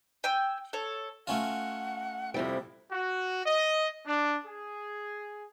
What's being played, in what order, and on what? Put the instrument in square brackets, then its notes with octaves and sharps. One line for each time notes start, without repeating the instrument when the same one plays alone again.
[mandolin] G5 G#5 E6
A4 C#5
[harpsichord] A3 C#4 F4 [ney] F#5
[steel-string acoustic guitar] F2 C3 G3 [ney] E4
[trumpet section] F#4
D#5
D4
G#4